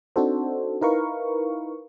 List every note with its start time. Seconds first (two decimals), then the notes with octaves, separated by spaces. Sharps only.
0.16 C4 D4 D#4 F#4 A4 C5
0.81 D#4 E4 A#4 B4 F5 C#6